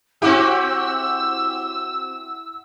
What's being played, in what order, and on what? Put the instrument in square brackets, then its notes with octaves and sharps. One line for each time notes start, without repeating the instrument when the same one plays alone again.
[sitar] C4 F#4 G4 [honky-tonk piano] E4 F#5 D6 [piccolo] E6